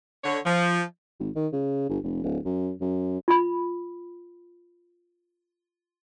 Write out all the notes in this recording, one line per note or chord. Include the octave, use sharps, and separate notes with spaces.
D3 C#5
F3
G#1
D#3
C#3
G1
F1
D1
F#2
F#2
F4 B5